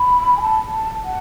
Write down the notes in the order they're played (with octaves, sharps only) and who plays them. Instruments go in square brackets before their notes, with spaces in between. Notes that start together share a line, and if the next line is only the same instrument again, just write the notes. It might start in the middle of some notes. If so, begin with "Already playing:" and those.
Already playing: [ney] B5
G#5
A5
A5
F#5